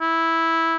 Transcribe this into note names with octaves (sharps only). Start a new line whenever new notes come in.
E4